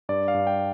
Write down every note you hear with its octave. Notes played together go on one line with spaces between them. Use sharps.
G2 D5
F5
G2
G5